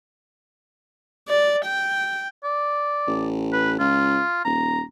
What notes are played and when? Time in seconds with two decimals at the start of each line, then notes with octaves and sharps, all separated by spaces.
1.28 D5
1.65 G5
2.44 D5
3.08 A1
3.53 B4
3.80 C#2 F4
4.45 D#1 A#5